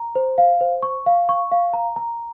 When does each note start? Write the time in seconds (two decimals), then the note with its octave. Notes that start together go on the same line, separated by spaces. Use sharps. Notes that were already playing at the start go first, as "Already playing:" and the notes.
Already playing: A#5
0.15 C5
0.38 F5
0.61 C5
0.82 C#6
1.06 F5
1.29 C#6
1.52 F5
1.73 A#5
1.96 A#5